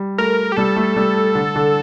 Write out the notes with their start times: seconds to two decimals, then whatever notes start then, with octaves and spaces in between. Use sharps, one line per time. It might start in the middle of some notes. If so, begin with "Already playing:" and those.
Already playing: G3
0.18 A3 A#4
0.52 G4
0.57 G3 A4
0.76 A3
0.97 G3
1.35 D3
1.56 D3